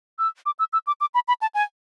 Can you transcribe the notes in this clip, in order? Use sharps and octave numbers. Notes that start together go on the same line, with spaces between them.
E6
D6
E6
E6
D6
D6
B5
B5
A5
G#5